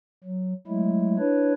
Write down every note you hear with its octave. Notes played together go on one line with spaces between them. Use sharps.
F#3
F#3 G#3 A3 E4
D4 E4 B4 C#5